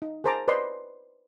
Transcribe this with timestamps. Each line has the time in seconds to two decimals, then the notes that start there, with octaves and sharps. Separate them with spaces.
0.02 D#4
0.24 G#4 A#4 C5 A5 A#5 D6
0.48 B4 C5 D5 D#5 B5 C6